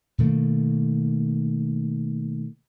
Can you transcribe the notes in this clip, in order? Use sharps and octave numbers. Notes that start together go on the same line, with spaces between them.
B2 D#3 A3 A#3